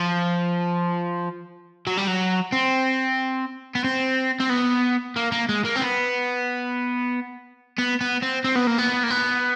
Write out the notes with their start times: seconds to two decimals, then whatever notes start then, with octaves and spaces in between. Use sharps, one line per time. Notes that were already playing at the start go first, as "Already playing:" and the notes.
Already playing: F3
1.87 F#3
1.97 G3
2.07 F#3
2.52 C4
3.75 B3
3.84 C4
4.40 C4
4.49 B3
5.16 A#3
5.32 A#3
5.49 G#3
5.65 A#3
5.76 C4
5.81 B3
7.78 B3
8.01 B3
8.23 C4
8.44 C4
8.56 B3
8.67 A#3
8.78 B3
9.03 A#3
9.10 B3